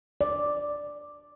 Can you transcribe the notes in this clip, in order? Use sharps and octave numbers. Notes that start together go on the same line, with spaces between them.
D5